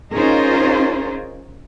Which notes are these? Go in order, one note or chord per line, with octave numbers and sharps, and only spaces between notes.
C#4 D#4 F4 G#4 A#4 C5